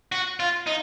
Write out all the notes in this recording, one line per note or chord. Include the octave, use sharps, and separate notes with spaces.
F#4
F4
D#4